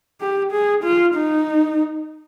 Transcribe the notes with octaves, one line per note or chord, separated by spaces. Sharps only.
G4
G#4
F4
D#4